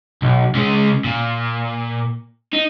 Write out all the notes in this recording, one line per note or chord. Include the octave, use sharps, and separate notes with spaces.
B1
C#3 G#3
A#2
D#4